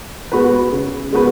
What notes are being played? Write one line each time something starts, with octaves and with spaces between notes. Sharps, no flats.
G#3 B3 F#4 B4
C#3
G#3 B3 F#4 B4